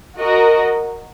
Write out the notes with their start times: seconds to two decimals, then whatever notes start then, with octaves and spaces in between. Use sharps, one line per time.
0.18 F#4 A#4 D#5